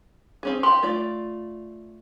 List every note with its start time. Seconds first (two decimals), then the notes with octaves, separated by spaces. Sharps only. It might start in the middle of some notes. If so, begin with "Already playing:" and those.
0.43 C4 C#4 G#4
0.63 G4 G5 C6
0.83 A3 F4 D5